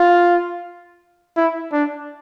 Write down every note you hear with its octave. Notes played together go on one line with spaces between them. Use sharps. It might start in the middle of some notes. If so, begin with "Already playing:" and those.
Already playing: F4
E4
D4